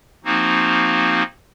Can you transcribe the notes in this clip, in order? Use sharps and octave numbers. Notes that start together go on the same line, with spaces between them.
F3 A#3 C4 D#4 F#4